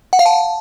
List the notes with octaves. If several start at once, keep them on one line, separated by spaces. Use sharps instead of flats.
F#5
F5
A5